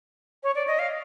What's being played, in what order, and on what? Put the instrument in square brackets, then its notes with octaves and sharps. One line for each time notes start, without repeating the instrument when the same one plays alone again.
[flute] C#5
D5
D#5
F5